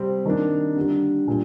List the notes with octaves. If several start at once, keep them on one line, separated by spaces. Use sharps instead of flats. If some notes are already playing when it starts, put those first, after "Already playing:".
Already playing: C3 G3 C4
D#3 A#3 D4
D3 G3 D4
A#2 G3 D4 F4